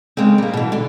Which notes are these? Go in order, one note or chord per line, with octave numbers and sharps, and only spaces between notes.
C#3 G#3 A#3 C4
G3 A#3
B2 E3
D3 D4